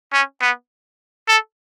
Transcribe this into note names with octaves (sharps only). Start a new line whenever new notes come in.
C#4
B3
A4